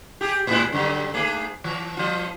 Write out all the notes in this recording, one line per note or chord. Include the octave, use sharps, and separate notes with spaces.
G4 G#4
A2 G#3 E4
F#2 D3
G#2 A3 G#4
E3
F3 F4